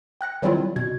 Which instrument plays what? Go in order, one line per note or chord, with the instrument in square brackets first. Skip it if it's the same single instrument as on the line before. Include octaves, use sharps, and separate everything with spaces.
[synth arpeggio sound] G5 F#6 A#6 C#7
D#3 F#3 G3 C4 E4 F4
B2 G#6